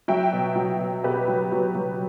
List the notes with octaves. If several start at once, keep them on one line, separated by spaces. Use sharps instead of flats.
F#3 E5 G5
B2
F#3
B2
B2 G4 B4
F#3
F#3
F#3